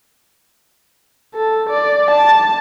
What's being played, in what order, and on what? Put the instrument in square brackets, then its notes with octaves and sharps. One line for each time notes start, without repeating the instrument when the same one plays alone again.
[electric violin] A4
D5
A5